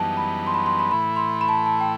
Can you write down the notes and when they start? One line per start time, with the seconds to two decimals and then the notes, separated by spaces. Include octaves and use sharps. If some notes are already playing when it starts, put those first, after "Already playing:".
Already playing: F#2 E3 G3 B3 D#4 A5
0.17 B5
0.47 C6
0.54 B5
0.66 C6
0.79 B5
0.91 A2 E3 A3 E4 B5
1.16 C6
1.41 B5
1.49 A5
1.56 B5
1.66 A5
1.80 G5